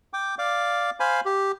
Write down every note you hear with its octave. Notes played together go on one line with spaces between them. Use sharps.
G5 D6
D5 F5 D6
C5 F5 G#5 B5
G4